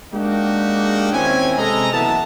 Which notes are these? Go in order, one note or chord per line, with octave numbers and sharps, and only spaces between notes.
G#3 A#3 D4 D#4 F#4 G4
D#2 C4 C#4 E4 G#5
C3 G#3 A4 D#5 A#5
F#1 E3 B3 E5 A5